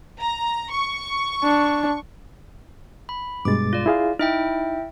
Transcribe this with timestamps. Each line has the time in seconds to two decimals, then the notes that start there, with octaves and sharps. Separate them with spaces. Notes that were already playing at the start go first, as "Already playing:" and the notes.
0.20 A#5
0.71 C#6
1.43 D4
3.09 B5
3.45 G2 B2 G#3 D6 A6
3.73 F4 D5
3.86 E4 G#4 F5
4.19 D#4 E4 E5 G5